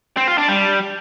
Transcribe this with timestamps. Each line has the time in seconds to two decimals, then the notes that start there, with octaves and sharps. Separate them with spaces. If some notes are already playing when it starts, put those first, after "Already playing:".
0.17 C4
0.28 F4
0.38 D4
0.48 G3